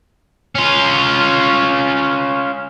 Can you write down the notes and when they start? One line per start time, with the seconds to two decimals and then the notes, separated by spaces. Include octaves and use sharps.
0.55 C#4 F4